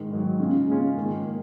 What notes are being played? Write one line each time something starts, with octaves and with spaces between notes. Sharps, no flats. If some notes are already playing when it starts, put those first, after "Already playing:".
Already playing: G#2 D#3
G#2 D#3 F#3
C#3 G#3 C#4 F4
C#3 G#3 C#4 F4
G#2 D#3 A#3
D#3 A#3